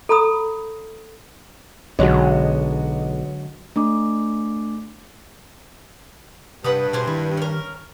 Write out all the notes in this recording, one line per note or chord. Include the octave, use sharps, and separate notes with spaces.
A4 A#5 B5 D#6
B1 D3 F#3 G#3 F#4 C#5 D#5
A3 D4 D6
G2 C3 B4 F#5 D#6
B2 D4 G#4 C5
D#3 E4
C#4 A#4